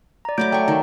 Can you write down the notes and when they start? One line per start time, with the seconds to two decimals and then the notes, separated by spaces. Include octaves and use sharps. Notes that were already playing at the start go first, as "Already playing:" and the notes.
0.25 D5 A#5
0.38 F#3 A3 B5 D6 G6 D7
0.52 A3 D5 G5 C#6
0.68 D#3